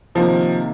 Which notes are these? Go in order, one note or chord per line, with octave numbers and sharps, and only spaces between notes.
C3 D#3 F3 A#3